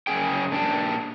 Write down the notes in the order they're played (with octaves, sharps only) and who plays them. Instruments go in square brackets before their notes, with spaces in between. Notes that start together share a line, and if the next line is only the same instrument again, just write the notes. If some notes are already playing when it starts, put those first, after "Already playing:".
[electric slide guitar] F#2 C#3 C#4 G#4 G5
A#2 D4 D5 G5 A5